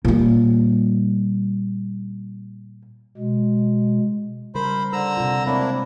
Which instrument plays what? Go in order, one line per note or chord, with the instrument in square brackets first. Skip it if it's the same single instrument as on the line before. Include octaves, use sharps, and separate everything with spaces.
[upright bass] A#2 G3
[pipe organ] B2 G#3
[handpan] C#3 G3 A#4 [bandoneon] C5 B5
[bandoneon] D3 A#5 E6 [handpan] C5
[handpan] C3 F4
[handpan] G#3 C4 C#5 [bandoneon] A#3 D4 E4